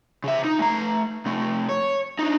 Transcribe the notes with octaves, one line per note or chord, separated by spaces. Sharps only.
C#3 E5
D#4
A3 A#5
C3 A3
C#5
D4 D#4